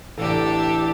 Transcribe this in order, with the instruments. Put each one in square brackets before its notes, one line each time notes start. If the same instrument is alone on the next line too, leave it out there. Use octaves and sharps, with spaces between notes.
[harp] A1 [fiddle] D4 G4 [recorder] A4